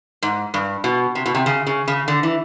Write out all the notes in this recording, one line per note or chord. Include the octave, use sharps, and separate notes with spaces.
G#2
G2
B2
C3
B2
C3
C#3
C#3
C#3
D3
E3